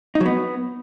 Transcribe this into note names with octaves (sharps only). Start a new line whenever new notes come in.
D#4
F#3
B3